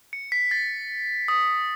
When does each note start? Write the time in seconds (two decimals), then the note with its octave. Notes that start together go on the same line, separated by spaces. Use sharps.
0.13 C#7
0.32 B6
0.51 A6
1.28 D#6